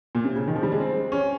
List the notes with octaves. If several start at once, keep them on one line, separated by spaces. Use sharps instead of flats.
A#2
C3
C#3
D#3
F3
G3
G#3
C4
C#4